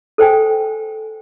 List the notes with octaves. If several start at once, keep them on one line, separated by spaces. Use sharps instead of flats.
A4 C5 G5 G#5